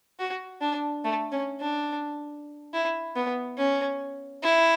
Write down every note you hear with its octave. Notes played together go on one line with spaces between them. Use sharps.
F#4
D4
A3
C#4
D4
E4
B3
C#4
E4